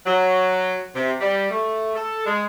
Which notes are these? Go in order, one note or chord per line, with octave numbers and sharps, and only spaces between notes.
F#3
C3
G3
A3
A4
G#3